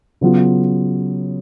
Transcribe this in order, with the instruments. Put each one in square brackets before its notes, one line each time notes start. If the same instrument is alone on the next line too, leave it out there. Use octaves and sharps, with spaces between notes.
[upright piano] C#3 F#3 B3 F4